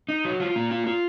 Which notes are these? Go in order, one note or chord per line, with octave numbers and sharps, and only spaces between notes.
D#4
F#3
F4
A#3
F4
F4